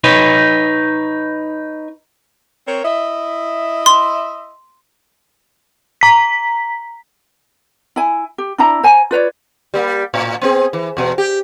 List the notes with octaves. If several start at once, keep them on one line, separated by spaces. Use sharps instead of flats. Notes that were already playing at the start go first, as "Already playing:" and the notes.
D#4 B4 C#5
C4 A#4 C#5
E4 D#5 E5
C6
A#5 B6
E4 G#5
G4
D4 E4 A#5
C5 G#5 A#5
F4 B4 C#5 D5
G3 A#3
A2
B3 C4 G#4
E3
E2 B2
G4